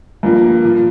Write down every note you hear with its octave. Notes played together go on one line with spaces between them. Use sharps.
G2 F3 A#3
A#2 F3